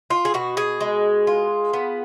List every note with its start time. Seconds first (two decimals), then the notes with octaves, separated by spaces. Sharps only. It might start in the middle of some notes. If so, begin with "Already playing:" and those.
0.10 F4
0.25 G#4
0.34 B2 F#4
0.57 G#4
0.81 G#3
1.27 F4
1.73 B3